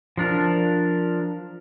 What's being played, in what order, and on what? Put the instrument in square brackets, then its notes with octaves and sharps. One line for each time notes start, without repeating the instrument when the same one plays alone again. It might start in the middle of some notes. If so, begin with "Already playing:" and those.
[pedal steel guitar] F3 D4 A#4